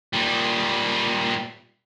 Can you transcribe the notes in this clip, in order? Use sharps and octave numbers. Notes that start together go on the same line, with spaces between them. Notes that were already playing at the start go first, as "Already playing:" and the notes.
A#2 G3